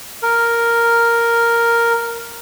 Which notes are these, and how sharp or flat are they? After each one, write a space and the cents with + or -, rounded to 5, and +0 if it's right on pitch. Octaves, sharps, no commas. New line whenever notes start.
A#4 +0